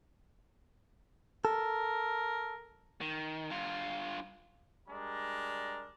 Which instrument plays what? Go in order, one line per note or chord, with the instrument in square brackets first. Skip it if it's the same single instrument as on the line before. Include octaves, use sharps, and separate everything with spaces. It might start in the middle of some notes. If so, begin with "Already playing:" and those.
[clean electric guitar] A4 [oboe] A#4
[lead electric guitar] D#3
G2 F4
[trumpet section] G3 G#3 D4 A#4 A#5